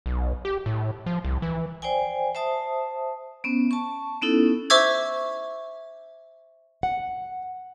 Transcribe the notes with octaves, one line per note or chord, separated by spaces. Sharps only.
B1
G4
A2
F3
C2
E3
C5 D5 G5 G#5
C5 E5 A5 D#6
B3 C#4
A5 C#6
B3 C#4 D#4 E4 A4
C5 E5 C#6 D6 E6 G#6
F#5